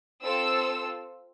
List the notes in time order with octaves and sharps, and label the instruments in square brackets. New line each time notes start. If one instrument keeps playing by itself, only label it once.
[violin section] C4 F4 A4 E6